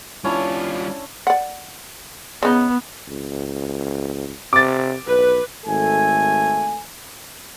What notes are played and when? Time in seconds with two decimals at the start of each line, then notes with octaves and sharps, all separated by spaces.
0.24 G3 C#4 D4 E4 F4
1.27 D5 F#5
2.43 C#3 B3 D#4
3.08 C#2
4.53 C3 D6 A6
5.07 B1 B4
5.66 G#1 A3 A4 G#5